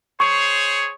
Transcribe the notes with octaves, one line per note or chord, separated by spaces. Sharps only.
G#4 C5 C#5 C#6